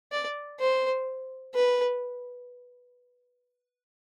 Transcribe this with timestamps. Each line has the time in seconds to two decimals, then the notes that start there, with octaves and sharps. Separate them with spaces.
0.12 D5
0.60 C5
1.55 B4